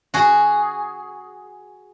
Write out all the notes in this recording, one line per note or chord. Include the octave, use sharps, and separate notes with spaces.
F#4 G#4